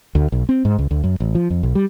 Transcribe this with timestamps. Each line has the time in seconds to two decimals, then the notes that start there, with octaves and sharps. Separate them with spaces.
0.15 D2
0.32 B1
0.49 C4
0.65 G#2
0.79 C#2
0.91 D2
1.04 F#2
1.20 A1
1.35 F3
1.50 F2
1.63 B1
1.75 G3